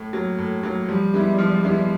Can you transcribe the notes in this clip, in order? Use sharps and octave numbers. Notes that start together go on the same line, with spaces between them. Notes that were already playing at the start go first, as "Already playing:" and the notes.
Already playing: A2
F#3 A#3
A2
F#3 A#3
F3 G3
G#3 B3 E4
F3
G#3 B3 E4